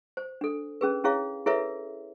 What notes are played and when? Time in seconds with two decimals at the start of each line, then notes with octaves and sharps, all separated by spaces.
0.17 C5
0.41 D4 A4
0.81 C#4 G#4 B4
1.04 C#4 E4 G#4 C#5 F5
1.46 E4 G#4 A4 B4 C#5 E5